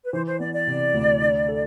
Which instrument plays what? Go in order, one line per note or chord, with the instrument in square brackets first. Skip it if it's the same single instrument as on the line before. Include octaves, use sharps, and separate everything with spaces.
[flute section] B4
[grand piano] E3 [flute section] C5
[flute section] C5
[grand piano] B3 [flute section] D5
[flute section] D5
[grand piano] C3
D2
D4
A4